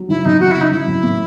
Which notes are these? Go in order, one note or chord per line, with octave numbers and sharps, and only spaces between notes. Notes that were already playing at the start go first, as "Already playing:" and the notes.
Already playing: F#3
F#1 E4
F#2 D#4
F#3 F#4
C#3 E4
D#4
F#1 E4
F#2
A2